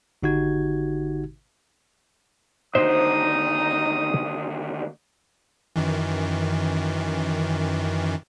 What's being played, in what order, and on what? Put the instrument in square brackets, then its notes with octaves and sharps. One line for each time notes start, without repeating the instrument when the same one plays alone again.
[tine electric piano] G#1 D3 D#4 F#4 G4 G#6
[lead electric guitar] D#2 D3 [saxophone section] D#4 [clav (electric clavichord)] C5 [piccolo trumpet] D#6
[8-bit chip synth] F#2 D#3 E3